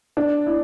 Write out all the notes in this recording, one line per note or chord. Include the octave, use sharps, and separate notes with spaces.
D4
E4